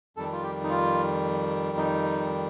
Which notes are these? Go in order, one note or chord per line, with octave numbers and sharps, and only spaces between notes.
F2 D#3 G3 A4
F4
G4
D#4
F4
D#4